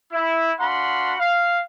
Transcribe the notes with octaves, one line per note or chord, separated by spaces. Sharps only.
E4
D4 F#4 F5 F#5 B5 C6
F5